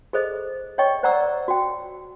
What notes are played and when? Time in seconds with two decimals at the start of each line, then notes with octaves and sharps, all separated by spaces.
0.13 G#4 A4 C5 D#5
0.78 C#5 D#5 G5 C#6
1.03 C5 D5 F#5 A#5 D6 E6
1.48 F#4 G5